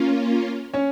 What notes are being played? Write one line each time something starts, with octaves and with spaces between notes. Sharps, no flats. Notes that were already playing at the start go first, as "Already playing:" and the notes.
Already playing: A#3 C#4 F4
C#4 C#5